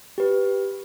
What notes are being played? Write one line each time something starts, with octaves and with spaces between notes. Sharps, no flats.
G4 B4